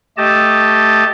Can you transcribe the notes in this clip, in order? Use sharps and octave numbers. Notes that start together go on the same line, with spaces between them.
A3 G4 D#5 A5